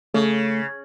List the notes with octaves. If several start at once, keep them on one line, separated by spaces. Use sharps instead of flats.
C#3 A3